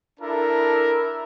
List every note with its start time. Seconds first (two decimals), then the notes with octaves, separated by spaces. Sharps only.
0.20 D4 E4 A4 A#4